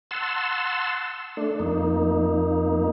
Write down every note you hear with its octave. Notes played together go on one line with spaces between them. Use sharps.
F#5 A5 C6 E6
A3 D4
F2 A#3 D#4